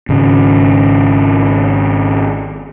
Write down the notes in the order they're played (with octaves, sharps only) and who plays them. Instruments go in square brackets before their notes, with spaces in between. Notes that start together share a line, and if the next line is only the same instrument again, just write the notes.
[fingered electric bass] G#1 C#3